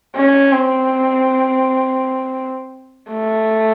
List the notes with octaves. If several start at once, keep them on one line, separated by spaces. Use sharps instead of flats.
C#4
C4
A3